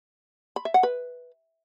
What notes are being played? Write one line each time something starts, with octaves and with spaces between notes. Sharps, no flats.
B5
E5
F#5
B4